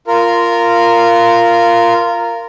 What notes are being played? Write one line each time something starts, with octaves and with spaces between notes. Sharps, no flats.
F4 A#4